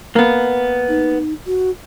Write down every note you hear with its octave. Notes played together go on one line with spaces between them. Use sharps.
A#3 B3
D#4
F#4